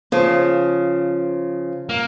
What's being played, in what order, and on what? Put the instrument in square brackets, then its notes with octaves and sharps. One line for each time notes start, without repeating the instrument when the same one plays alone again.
[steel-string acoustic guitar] C#3 F3
[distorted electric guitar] A#3